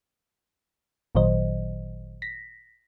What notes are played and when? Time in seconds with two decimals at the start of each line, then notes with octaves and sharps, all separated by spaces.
1.15 G#1 A#2 D#3 F#3 C5 D#5
2.22 A#6 B6